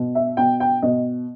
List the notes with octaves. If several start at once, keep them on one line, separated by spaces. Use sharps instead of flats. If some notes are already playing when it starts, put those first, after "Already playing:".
Already playing: B2
E5
B2 G5
G5
B2 D#5